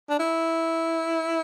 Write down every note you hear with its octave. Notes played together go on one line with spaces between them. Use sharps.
D4
E4